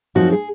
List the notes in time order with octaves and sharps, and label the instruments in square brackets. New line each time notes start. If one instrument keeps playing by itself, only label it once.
[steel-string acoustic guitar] F#2 F3 C4 D#4 F#4
G#4